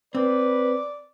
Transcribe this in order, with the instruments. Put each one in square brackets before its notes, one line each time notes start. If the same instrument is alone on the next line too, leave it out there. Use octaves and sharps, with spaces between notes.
[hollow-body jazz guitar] C4 [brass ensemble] B4 [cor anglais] D5